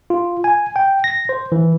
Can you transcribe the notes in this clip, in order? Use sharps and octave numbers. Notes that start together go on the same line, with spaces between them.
F4
G#5
G5
A#6
C5
E3